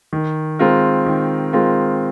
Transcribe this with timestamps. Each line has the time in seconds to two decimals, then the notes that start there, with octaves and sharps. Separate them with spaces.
0.13 D#3
0.59 G#3 C4 F4 A#4
1.06 D#3
1.53 G#3 C4 F4 A#4